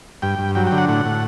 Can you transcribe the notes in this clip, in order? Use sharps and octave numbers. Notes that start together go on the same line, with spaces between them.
G2 G5
G2
F#3 G5
G5
D3
F#5
A2 F#5
A2